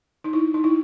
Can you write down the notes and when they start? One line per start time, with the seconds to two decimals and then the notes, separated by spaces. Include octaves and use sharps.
0.24 D#4
0.33 E4
0.54 D#4
0.64 E4